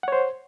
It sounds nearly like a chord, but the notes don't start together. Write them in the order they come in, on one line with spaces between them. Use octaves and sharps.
F#5 C#5 C5